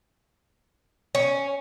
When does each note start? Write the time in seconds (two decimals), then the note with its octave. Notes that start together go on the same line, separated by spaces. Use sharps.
1.15 C#4